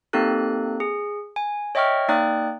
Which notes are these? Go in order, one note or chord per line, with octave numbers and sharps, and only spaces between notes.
A#3 C4 D#4 G4 A4 F#6
G#4
G#5
C#5 D#5 E5 G5 C#6 F6
A#3 D#4 D5 G5 D#6 F#6